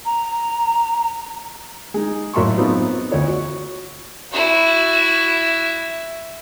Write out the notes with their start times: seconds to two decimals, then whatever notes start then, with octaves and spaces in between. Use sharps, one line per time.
0.04 A#5
1.94 G#3 D#4
2.34 A2 F#3 A#3 E5 C6 C#6
2.57 F#3 B3 C4 D#4 F4
3.11 D2 C#5
3.28 F#4
4.32 E4 F#4